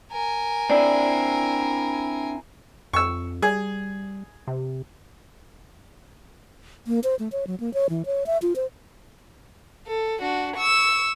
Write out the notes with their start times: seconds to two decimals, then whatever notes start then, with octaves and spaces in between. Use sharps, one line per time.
0.12 A#4 G#5
0.70 C4 D4 E4 D5
2.93 F2 C#6 E6
3.42 G3 G#4
4.47 C3
6.87 A#3
7.04 C5
7.19 A3
7.32 C#5
7.47 F#3
7.60 A#3
7.74 C#5
7.89 E3
8.06 C#5
8.26 E5
8.42 F4
8.56 C5
9.87 A4
10.20 D4 F#4
10.56 C#6 E6